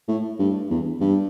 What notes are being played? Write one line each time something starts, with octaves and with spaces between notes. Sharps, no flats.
A2
G2
E2
G2